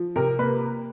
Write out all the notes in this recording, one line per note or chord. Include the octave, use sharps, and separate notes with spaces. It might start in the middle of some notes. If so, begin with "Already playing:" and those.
Already playing: F3
C3 A#4
A#3 B4